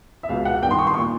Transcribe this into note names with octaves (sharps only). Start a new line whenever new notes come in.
E5
C#2 B2 F5
F#5
G2 D#3 G5 C6
C#6
C6
A#2 C#6